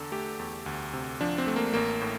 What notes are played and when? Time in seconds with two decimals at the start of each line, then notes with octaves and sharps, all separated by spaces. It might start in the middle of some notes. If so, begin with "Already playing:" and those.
Already playing: E2 D3 A4
0.12 A3 G4
0.39 E2
0.66 D2
0.93 C3
1.21 F3 D4
1.38 C4
1.47 A3
1.56 A#3
1.74 A1 A#3
2.01 A2